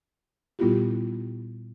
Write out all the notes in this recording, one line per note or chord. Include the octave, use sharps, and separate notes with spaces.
A#2 G3 B3 E4 F4 G4